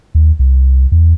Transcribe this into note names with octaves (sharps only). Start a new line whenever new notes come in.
D#2
C2
E2